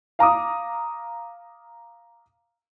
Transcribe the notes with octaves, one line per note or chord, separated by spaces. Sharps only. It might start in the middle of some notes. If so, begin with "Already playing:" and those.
F5 A#5 D6 D#6